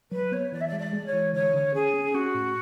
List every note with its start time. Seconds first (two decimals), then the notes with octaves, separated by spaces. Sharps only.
0.11 F#3 B4
0.32 B3 C#5
0.52 E3 D5
0.60 E5
0.67 D5
0.72 G#3
0.79 D5
0.93 G#3
1.06 C#5
1.13 E3
1.33 D3 C#5
1.54 D3
1.73 C#4 G#4
1.94 C#4
2.14 C#4 F#4
2.34 A2